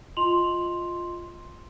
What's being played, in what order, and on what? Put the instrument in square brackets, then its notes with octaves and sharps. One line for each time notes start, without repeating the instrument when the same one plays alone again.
[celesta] F4 D#5 C6 F7 F#7